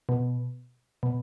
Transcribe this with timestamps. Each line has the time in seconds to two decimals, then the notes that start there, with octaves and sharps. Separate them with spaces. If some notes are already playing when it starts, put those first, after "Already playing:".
0.09 B2
1.03 B2